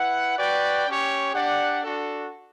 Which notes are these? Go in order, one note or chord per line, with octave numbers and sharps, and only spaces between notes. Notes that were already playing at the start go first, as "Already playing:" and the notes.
Already playing: E4 B4 F#5
F#4 B4 D5 G5
C#4 G4 C#5
D4 G4 D5 F#5
D4 F#4 A4